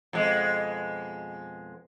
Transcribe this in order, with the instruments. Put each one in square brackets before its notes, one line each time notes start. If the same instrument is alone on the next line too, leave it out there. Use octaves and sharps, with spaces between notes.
[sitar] F2 B2 G#3